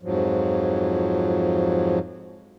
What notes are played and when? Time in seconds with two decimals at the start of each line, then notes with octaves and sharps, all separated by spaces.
0.02 F2 G#2 F3 F#3